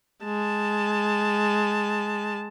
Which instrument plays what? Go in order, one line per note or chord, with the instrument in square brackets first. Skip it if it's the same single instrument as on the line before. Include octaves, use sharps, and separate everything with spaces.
[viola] G#3 A5